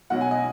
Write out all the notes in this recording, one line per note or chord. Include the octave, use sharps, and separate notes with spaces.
B1 B2 F#3 F#5
G#5
D#5